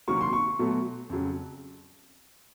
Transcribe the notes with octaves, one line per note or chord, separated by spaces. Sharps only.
C3 D#3 F#3 A#3 C#6
C6
C#6
B2 F#3 A3
F2 C#3 F#3